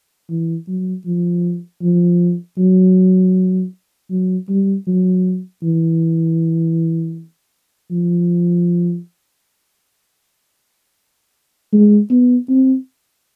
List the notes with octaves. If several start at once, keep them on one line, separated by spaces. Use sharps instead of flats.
E3
F#3
F3
F3
F#3
F#3
G3
F#3
E3
F3
G#3
B3
C4